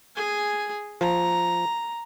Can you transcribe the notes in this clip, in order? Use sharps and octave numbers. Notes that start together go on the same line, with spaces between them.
G#4 G#5
F3 A#5